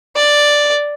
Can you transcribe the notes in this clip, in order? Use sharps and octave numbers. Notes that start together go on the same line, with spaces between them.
D5